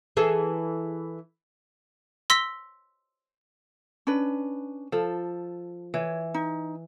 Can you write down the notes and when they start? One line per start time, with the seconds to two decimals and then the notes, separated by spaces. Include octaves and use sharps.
0.17 E3 G#4 A4
2.30 C6 E6 A#6 B6 G7
4.07 C#4 D4 B4
4.92 F3 A4
5.94 E3 C#5
6.34 D#4